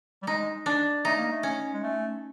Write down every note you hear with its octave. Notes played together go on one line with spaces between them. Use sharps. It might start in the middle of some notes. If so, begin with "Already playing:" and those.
G3
G#3 D#4
D4
A3 D#4
A#3
A3
C#4
G#3
A3